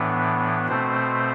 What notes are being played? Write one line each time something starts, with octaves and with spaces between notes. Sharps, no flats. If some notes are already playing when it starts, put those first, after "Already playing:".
Already playing: A2 E3 B3 D4
B2 A3 C4 C5